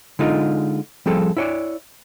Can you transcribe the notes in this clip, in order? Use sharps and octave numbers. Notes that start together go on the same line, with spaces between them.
D3 G#3 D#4 F4
F3 G3 C4 G#4 A4
E4 C#5 D5